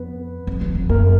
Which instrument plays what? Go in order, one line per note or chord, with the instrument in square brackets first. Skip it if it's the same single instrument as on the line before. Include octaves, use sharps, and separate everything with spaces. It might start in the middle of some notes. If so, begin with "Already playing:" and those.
Already playing: [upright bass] F2 [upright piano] B3 B4
[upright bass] F2
E2
F2
[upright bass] F#2 [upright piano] A#3 A#4